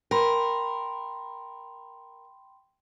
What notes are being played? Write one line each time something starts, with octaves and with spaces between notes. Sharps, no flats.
A#4 G5 B5 C6